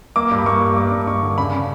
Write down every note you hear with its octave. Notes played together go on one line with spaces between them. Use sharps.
A#3 D6
G2
B5
A#3 C#6
G2
A#3 D6
G2
G2 C#6
D3
C#3 B5
C#3